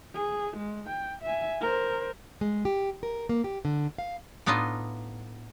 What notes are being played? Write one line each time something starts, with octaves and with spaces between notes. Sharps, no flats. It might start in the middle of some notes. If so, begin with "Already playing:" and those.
G#4
G#3
G5
E5 G#5
A#4 C5
G#3
G4
A#4
A#3
G4
D3
F5
A2 B3 D4 D#4 F4 D#5